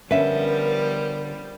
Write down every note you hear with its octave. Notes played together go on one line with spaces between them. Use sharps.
D3 F3 G3 B3 C#4 A#4 B4 E5